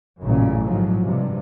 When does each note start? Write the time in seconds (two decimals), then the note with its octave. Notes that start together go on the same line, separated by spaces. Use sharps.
0.22 A1 F#2 A#2 C#3
0.65 G#2 F3 F#3
1.05 G2 C3